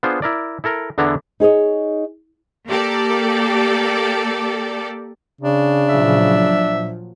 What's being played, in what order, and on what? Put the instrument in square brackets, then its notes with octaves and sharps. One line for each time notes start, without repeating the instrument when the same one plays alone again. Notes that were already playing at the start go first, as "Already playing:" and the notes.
[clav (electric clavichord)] B3 D4 F4 G#4 C5
E4 A#4 D5
E4 A4 A#4
E2 D3 B3 D4 E4 A#5
[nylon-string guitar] D#4 G#4 C#5 D#5
[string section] A#3 G4 A4 D5
[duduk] C#3 [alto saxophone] D4
[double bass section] A#2 F3 F#3 [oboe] E5